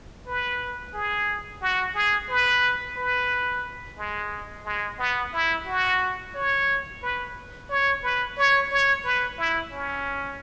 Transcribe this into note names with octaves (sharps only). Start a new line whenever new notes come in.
B4
G#4
F#4
G#4
B4
B4
G#3
G#3
B3
E4
F#4
C#5
B4
C#5
B4
C#5
C#5
B4
E4
C#4